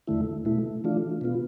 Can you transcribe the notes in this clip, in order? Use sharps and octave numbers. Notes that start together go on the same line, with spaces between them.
E2 D3 A3 E4
B2 A3 E4
E3 A3 D4 F4
B2 B3 F4